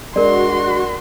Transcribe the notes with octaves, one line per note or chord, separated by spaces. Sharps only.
G#3 D4 F#4 A#4 D5 C6